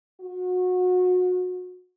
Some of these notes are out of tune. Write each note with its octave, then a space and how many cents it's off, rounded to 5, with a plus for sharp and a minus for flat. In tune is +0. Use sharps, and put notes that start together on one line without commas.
F#4 -25